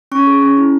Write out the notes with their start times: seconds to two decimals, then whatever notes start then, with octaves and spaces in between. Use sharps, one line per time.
0.12 C#4 C#6
0.27 G#4
0.42 C#4
0.57 E4